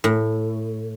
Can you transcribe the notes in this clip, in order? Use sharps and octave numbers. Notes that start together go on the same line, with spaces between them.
A2